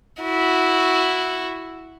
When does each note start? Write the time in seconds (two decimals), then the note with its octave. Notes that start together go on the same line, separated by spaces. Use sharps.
0.22 E4 F#4